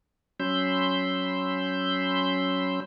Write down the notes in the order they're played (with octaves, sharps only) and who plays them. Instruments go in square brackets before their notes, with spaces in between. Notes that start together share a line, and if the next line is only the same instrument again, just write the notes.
[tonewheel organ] F#3 C#4 B5 C6 E6 G6